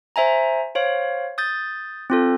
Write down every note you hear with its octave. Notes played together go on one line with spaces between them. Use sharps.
C5 E5 G#5 A#5
C5 C#5 F5
D#6 G6 A6
C4 F4 A4